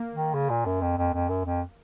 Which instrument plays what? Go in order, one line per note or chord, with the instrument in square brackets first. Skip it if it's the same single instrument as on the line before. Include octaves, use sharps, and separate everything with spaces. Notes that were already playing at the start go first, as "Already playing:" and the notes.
Already playing: [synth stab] A#3
[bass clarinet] D#3
C#3
A#2
F#2
F2
F2
F2
F#2
F2